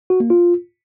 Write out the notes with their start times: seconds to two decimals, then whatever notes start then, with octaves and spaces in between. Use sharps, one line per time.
0.10 F#4
0.20 A#3
0.30 F4